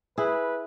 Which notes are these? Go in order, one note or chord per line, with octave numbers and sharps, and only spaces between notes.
E4 G#4 B4